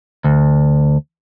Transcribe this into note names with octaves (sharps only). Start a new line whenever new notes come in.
D2